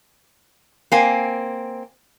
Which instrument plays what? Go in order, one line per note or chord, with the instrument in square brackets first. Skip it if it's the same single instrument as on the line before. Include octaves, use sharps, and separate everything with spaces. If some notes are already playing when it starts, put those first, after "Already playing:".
[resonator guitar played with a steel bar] A#3 C4 G#5